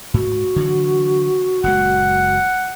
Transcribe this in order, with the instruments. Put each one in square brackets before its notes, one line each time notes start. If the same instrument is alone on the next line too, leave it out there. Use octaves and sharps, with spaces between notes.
[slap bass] G#2 [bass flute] F#4
[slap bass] D3 E3 F#3
[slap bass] F#1 A#2 G#3 [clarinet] F#5